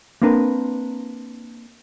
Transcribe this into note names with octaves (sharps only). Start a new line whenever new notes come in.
A#3 C4 D4 A#4 B4